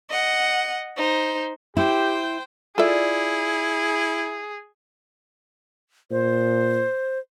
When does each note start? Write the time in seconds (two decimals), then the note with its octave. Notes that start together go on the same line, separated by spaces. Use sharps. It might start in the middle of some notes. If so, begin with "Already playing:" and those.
0.10 D#5 F#5
0.97 D#4 C5
1.77 E4 G4 C5 G5
2.78 E4 F4 G#4 A4 D5 E5
6.11 A#2 C5